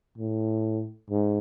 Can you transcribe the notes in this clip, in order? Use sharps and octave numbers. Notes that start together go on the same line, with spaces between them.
A2
G#2